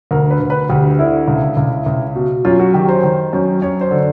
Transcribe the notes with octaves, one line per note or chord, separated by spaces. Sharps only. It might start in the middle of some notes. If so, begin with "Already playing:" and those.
D2 A#4
B4
D2
B4
D2 G4
D3 E4
C#2
C#2
C#2
B2
F#2 F4
F#4
D#3 G4
C5
D#3
F#2
F#2 C#5
C5
D3